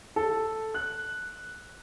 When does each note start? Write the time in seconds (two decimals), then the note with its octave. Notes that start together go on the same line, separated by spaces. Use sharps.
0.16 A4
0.74 F#6